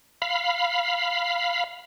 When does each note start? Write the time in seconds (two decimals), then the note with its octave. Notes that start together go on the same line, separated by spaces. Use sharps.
0.22 F5 B5